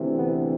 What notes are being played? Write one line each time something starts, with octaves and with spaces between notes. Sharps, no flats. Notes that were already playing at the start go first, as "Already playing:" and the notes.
Already playing: D2 C3 E3
B3